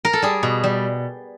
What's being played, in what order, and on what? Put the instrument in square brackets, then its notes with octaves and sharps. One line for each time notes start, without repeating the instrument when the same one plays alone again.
[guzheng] A#4
A4
G3 G#4
B2
G3